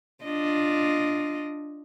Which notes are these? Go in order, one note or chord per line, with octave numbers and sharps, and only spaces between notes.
D4 F4 D#5